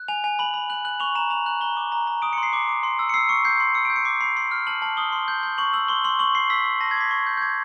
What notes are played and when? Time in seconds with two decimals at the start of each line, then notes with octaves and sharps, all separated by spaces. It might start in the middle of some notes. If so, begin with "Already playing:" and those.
Already playing: F#6
0.08 G#5 F7
0.24 G#5
0.39 B5 F#7
0.54 B5
0.70 F#6 F#7
0.85 F#6 F#7
1.00 C#6 F7
1.15 A#5 E7
1.30 A#5 F7
1.46 F#6 F#7
1.61 A#5 G7
1.77 D6
1.92 A#5
2.07 A#5
2.22 D#6 D7
2.33 C6 C#7
2.43 C7
2.53 D6
2.69 D6
2.83 C6
2.99 E6
3.09 C#7
3.14 E6 C7
3.29 C#6 C#7
3.45 G6 C7
3.60 C6
3.75 E6 C#7
3.85 G6 D7
3.96 C#7
4.05 D6 C7
4.21 B5 C7
4.36 C6 C7
4.51 F6
4.67 A5 F#7
4.82 A5 F#7
4.97 D#6 G7
5.12 C6
5.28 G6
5.43 G6
5.58 C#6 F#7
5.73 E6 F#7
5.88 C6 G7
6.04 C6 F#7
6.19 C#6 F#7
6.35 C#6 C7
6.50 E6 B6
6.65 C#6
6.80 A5 A#6
6.91 G#6
6.96 D6 B6
7.11 C#6
7.26 G6
7.37 G6
7.42 D6 G#6